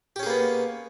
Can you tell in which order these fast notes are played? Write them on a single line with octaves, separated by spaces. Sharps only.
G4 C#4 G#4 A#3 B3